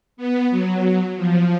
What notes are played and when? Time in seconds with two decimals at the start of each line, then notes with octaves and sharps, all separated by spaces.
0.17 B3
0.51 F#3
1.17 F3